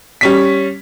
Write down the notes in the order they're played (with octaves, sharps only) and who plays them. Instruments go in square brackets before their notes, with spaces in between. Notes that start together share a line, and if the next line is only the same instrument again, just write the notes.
[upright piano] G3 C#4 B6